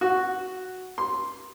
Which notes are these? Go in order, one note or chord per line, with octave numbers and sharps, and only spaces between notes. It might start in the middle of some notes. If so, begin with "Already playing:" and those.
F#4
C6